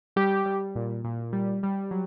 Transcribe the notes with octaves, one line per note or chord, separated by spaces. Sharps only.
G3 G4
G3
A#2
A#2
G3
G3
F#3